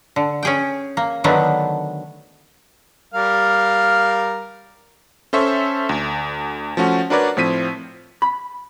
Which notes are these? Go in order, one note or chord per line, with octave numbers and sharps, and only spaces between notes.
D3
C#4 G#4 G5
A#3
D3 D#3 F#3 A3 B3 D4
G3 A#4 F5
C#4 A4 C5 E5 C#6
D2
F3 A3 C#4 F#4
D4 F#4 A#4 B4 C#5 D5
A2 F3 C4 B6 D#7
B5